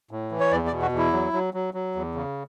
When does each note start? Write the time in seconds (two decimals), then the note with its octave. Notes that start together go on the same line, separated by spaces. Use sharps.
0.11 A2
0.31 E3
0.40 C#5
0.51 E2 D5
0.67 D5
0.72 B2
0.82 F#4
0.92 E2
0.98 E4
1.13 F#3
1.33 F#3
1.54 F#3
1.74 F#3
1.95 E2
2.15 C#3